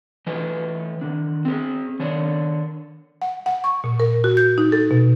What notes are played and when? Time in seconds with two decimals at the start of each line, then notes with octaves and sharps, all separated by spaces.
0.27 E3 A3 D#5
1.01 D#3 D4
1.45 C4 G#4
1.99 D#3 D4 C#5
3.22 F#5
3.46 F#5
3.64 C#6
3.84 A#2
4.00 A#4
4.24 F#4
4.37 G6
4.58 D#4
4.72 A4
4.91 B2